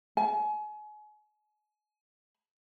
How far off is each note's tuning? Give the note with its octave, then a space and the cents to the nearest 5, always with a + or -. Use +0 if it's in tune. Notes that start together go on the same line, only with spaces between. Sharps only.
G#5 +35